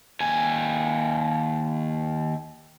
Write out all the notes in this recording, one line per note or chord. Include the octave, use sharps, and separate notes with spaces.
D#2 G#5